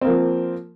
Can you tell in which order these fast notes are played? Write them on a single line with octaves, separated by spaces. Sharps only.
C4 A#3 F3